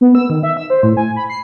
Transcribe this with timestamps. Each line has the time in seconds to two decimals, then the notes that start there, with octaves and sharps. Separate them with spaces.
0.01 B3
0.15 E6
0.30 D#3
0.43 E5
0.57 E6
0.70 C5
0.83 A2
0.97 G#5
1.16 B5
1.30 C7